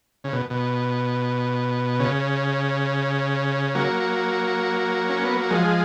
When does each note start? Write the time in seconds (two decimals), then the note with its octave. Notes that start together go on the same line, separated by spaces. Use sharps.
0.24 C#3
0.33 B2
0.50 B2
2.00 C#3
3.75 F#3 A#3
5.09 C#4
5.23 B3
5.37 A#3
5.50 F3 G#3